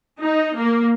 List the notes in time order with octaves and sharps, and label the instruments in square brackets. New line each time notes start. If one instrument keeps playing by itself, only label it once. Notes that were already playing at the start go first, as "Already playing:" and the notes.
[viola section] D#4
A#3